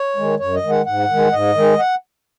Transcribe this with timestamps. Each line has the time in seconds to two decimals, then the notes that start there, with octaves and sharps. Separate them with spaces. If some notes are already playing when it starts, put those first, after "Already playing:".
Already playing: C#5
0.16 D#3 G#3
0.39 F#2 C#5
0.54 D#5
0.63 D#3 G#3
0.70 F#5
0.86 G#2 F#5
1.09 D#3 G#3
1.32 G#2 D#5
1.55 D#3 G#3
1.79 F#5